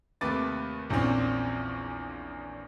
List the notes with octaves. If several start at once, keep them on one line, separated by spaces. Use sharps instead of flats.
D#2 C3 A3 B4 D6 A6
A#1 E2 A#2 C4 C#4